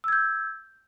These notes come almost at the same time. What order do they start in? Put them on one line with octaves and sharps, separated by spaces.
E6 G#6 G6